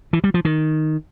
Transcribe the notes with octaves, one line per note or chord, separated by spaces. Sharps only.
E3
G3
F3
D#3